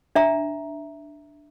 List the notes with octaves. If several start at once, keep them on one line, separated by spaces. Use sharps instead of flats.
D4 E5 A#5